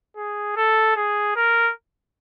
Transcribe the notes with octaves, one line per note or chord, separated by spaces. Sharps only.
G#4
A4
G#4
A#4